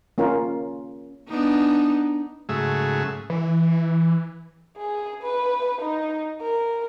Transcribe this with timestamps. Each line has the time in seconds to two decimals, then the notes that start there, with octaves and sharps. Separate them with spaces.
0.18 A#3 C#4 F4 A#4
1.28 B3 D4 D#4
2.49 G#2 C#3 F#3 A3 G#4 E5
3.30 E3
4.77 G#4
5.23 B4
5.81 D#4
6.41 A#4